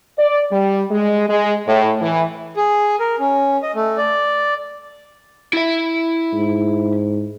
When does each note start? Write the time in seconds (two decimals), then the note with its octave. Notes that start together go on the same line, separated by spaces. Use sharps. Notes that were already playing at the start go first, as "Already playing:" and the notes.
0.19 D5
0.52 G3
0.90 G#3
1.29 G#3
1.67 A2
2.01 E3
2.57 G#4
3.00 A#4
3.19 C#4
3.63 D#5
3.75 A3
3.97 D5
5.53 E4 E5
6.33 G#2